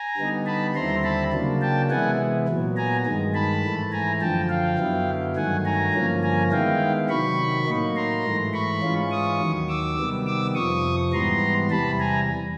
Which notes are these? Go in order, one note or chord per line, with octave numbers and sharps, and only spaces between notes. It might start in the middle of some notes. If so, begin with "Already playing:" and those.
Already playing: G#5 A#5
D3 G3 B3 D#4
A5 B5
D#2 D3 G3 C4 E4 A#5 C6
A5 B5
C#3 F#3 A#3 D4
G5 A5
C3 E3 G#3 B3 E4 F#5 G#5
A#2 F#3 B3
G#5 A#5
G2 D#3 G#3
A5 B5
G#2 E3 A3
G#5 A#5
F#2 D3 F3 G5 A5
F5 G5
F#2 D3 F#3 B3 E4
G2 D#3 F#3 A3 F#5 G#5
G#5 A#5
G2 D3 F3 A#3 C#4
G#5 A#5
D#3 G#3 B3 E4 F5 G5
C3 D#3 F#3 B5 C#6
A2 F#3 A#3 D#4
A#5 C6
G#2 E3 A3
B5 C#6
G#2 E3 G#3 C#4 F4
C#6 D#6
D#2 D#3 F#3
D6 E6
C3 D#3 G3 B3
D6 E6
F2 C3 F3 C#6 D#6
G#2 E3 G3 B3 A#5 C6
E2 C3 E3 G3 A5 B5
G#5 A#5